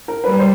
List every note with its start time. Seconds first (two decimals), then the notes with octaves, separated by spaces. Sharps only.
0.08 A#4
0.23 G3 B4
0.39 C5